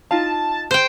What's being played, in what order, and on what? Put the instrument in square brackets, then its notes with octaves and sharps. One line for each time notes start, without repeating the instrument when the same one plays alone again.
[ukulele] D#4 F4 F5 [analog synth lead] A5
[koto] C5 G5